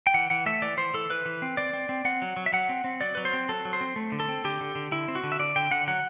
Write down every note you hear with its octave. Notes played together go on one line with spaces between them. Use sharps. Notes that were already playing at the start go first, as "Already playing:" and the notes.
G5
E3 F#5
E3 F#5
A3 E5
E3 D5
E3 C5
E3 A4
E3 B4
E3
C4
C4 D5
C4
C4
C4 F#5
F#3
F#3
E5
F#3 F#5
C4
C4
F#3 D5
F#3 B4
C5
C4
F#3 A4
F#3
C5
C4
A3
D3
A4
C4
D3 G4
D3
D3
D3 E4
C4
F#4
D3
E5
D3 D5
D3 G5
D3 F#5
F#3 F#5